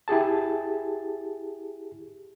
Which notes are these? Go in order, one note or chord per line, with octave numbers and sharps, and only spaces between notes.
E4 G4 G#4 A5